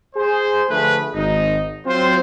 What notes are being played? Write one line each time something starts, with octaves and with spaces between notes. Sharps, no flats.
G#4 C5
D3 F3 A3 G#4 B4
G#1 D#4
F#3 C4 F4 C5